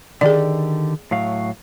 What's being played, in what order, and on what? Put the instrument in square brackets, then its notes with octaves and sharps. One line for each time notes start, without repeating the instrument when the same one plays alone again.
[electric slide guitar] D3 D#3 G4 [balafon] G#4 D5
[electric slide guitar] A2 F#3 F5